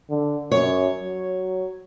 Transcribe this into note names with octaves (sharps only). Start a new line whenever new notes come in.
D3
F#2 C#5
F#3